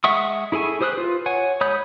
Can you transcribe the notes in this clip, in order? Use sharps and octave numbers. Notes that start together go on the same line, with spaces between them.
G#3 E5 F#5 C#6 D#6
E4 G#4 A4 G#5 C#6
G4 C5 D#6 F6 F#6
F4 B4
C#5 F#5 G#5
G#3 C#5 B5 D#6 G6